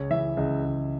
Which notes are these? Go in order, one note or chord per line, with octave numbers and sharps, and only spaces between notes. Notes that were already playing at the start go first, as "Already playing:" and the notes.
Already playing: C#2 C#5
E3 E5
C#2 D#5
C#2